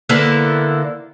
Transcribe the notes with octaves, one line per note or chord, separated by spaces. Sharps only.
D3 A#3 B3 E4